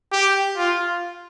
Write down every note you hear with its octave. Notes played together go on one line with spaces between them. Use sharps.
G4
F4